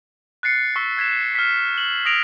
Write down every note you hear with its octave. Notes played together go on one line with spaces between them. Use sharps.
F#6 A6 C7 C#7
C#6 E6 B6 G7
F#6 G#6 B6 E7
F6 B6
E7 F#7
D#6 A#6 B6 D7 F7